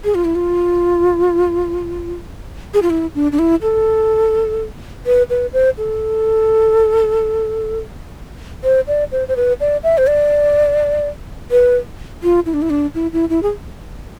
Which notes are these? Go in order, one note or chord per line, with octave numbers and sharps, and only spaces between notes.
G#4
F4
E4
F4
G#4
F4
E4
D4
D4
E4
A4
B4
B4
C5
A4
C5
D5
C5
C5
B4
D5
E5
C5
D5
B4
F4
E4
D4
E4
D4
E4
E4
E4
G#4